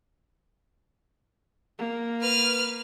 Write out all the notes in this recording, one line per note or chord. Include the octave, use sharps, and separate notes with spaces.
A#3
B4 F6